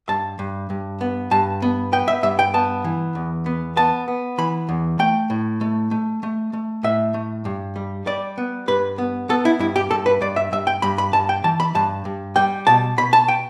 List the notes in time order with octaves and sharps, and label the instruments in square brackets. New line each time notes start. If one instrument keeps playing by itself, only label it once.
[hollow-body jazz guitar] G2 A5
G2
G2
B3
G2 A5
B3
B3 G5
E5
G2 E5
G5
B3 A5
E3
E2
B3
B3 A5
B3
E3 B5
E2
A3 G5
A2
A3
A3
A3
A3
A2 E5
A3
G2
G3
G3 D5
B3
G2 B4
B3
B3 A4
E4
G2 E4
G4
G2 A4
B4
G2 D5
E5
G2 E5
G5
G2 B5
B5
G2 A5
G5
E3 A5
B5
G2 A5
G2
G3 G5
B2 A5
B2 B5
A5
G5